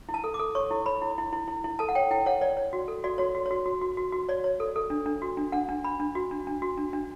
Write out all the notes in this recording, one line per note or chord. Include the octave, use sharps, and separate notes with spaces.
E4
A5
A4
D6
A4
C#5 C#6
E4
C#5 B5
E4
E4
E4
E4
E4
A4 A5
F#5
C#5 G5
E4 G5
C#5 F#5
C#5 D5
C#5
F#4
A4
F#4 D5
F#4 C#5
F#4
C#5
F#4
F#4
F#4
F#4
F#4
C#5 D5
C#5
A4
A4
D4
D4
F#4
D4
D4 F#5
D4
D4 B5
D4
F#4
D4
D4
F#4
D4
D4